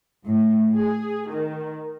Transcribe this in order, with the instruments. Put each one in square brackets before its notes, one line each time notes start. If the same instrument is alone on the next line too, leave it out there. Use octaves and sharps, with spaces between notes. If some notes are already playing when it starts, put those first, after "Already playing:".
[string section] A2
G#4
D#3